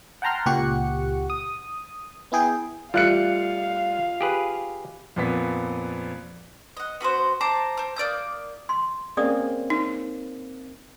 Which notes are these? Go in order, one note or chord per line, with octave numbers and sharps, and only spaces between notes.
F#5 G5 A5 A#5 C6 F6
C#2 A#2 G4 F#5 C#6 C#7
D#6
B3 E4 G#4 G5
G3 A3 F4 F5 F#6 C#7
G4 G#4 B4
F2 A#2 B3 B6
D#5 F#5
B3 F#4 A#4 C5
C5 A5 A#5 D6
C5 D6
A#3 D5 D#6 G6
C6
A#3 C4 C#4 G#4 D5 D#6
D#4